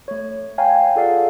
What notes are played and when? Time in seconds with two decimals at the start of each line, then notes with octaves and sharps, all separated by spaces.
0.08 A3 C#5
0.58 C#5 F5 G5 G#5 A#5
0.96 F4 G#4 A4 D5 F5 F#5